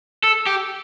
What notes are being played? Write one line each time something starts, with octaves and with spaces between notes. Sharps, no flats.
A4
G4